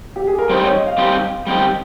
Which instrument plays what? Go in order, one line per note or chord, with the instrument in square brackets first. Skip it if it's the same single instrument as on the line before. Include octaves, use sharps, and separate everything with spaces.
[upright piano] G4
G#4
A#4
[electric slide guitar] G3 C4 D#4 G4 [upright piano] C5
[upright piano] C#5
D#5
F5
[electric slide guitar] G3 C4 D#4 G4
G3 C4 D#4 G4